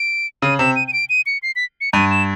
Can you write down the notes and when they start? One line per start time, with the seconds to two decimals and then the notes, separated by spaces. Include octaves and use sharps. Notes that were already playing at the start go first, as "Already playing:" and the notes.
Already playing: D7
0.42 C#3 D#7
0.59 C3 E7
0.76 D#7
0.88 D#7
0.93 D7
1.09 D#7
1.26 C#7
1.43 C7
1.56 B6
1.81 C#7
1.93 G2 D#7
2.11 E7